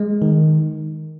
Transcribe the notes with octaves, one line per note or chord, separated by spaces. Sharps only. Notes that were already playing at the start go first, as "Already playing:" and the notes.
Already playing: G#3
D#3